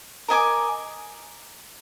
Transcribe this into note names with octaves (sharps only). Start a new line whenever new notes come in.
A#4 D#5 G#5 D6